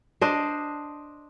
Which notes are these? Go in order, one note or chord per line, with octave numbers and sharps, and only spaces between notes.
D4 C5 D#5